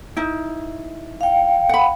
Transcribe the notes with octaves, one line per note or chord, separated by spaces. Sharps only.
D#4 E4
F5 G5
F#5 B5